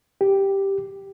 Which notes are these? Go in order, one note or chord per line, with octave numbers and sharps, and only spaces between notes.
G4